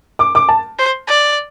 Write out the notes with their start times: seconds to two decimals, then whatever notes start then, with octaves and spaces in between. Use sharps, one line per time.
0.19 D6
0.35 D6
0.49 A5
0.79 C5
1.08 D5